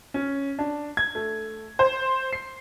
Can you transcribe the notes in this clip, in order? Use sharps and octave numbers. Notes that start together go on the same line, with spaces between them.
C#4
D4
G#6
A3
C5
C7